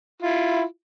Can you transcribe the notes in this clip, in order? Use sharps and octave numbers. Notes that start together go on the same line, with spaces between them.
E4 F4